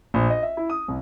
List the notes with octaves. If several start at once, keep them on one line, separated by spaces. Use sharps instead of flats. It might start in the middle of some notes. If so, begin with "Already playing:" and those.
A#1
D#5
E5
E4
D#6
C2